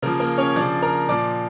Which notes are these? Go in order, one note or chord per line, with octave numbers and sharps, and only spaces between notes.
C#3 F3 A#3 A#4
A#3 A#4
C#4 C#5
C#3 F3 D4 D5
A#4 A#5
A#2 F3 D5 D6